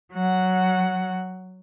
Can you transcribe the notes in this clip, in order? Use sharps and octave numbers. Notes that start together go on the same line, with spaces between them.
F#3 F#5